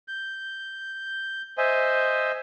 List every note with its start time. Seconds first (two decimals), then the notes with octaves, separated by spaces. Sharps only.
0.08 G6
1.58 C5 D#5 E5 G#5